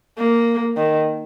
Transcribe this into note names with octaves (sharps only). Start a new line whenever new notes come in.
A#3
D#3